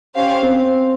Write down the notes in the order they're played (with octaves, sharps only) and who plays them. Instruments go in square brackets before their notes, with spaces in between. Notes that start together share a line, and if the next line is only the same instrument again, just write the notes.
[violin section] C#4 G4 C5 F5
[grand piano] C4